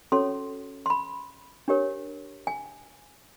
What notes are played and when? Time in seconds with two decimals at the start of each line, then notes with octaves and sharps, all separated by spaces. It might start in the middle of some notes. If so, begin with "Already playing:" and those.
0.12 C#4 F#4 A4 C#5 C6
0.86 C6
0.90 B5
1.68 D4 G4 A#4 C#5
2.47 G#5